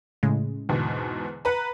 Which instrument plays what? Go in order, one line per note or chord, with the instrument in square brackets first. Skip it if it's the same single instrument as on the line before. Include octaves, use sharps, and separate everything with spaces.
[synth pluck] A2 C#3 G#3
[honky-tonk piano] E2 G#2 B2 [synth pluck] D3
[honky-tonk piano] B4 A#5 [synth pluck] F#5 B5